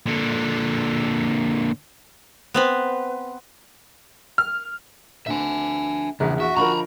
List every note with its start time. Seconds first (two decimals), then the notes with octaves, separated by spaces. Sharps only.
0.06 A#2 D3
2.54 B3 C4 B4
4.38 F6
5.27 D2 D3 C4 E5 G#5
6.20 A#1 E2 C#3
6.40 F#4 E5
6.57 D3 F3 A#4 D#5 A#5 B5 C#6